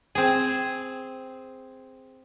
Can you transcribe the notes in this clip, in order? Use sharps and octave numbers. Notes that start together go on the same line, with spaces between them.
C4 G#4